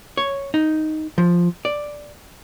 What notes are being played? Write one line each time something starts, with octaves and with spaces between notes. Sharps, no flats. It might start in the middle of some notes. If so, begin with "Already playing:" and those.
C#5
D#4
F3
D5